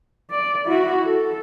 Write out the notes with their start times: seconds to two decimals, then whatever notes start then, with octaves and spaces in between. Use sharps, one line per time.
0.30 D5
0.66 E4 F#4
1.06 A4